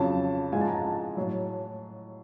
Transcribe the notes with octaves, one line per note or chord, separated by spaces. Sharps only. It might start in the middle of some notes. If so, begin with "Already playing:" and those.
Already playing: F2 C#3 F#3 A5
G#2 F3 G#3 G#5
A5
A#5
A5
A2 F#3